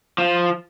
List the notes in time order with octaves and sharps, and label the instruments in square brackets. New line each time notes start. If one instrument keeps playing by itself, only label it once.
[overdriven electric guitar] F3